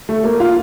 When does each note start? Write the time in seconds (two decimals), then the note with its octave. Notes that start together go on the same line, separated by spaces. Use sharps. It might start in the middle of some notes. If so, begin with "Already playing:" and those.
0.09 A3
0.24 A#3
0.40 F4